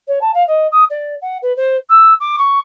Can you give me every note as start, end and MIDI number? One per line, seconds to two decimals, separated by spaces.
0.07 0.18 73
0.21 0.31 81
0.33 0.45 77
0.47 0.67 75
0.71 0.83 87
0.89 1.15 74
1.21 1.37 78
1.42 1.54 71
1.56 1.76 72
1.89 2.13 88
2.19 2.35 86
2.38 2.58 85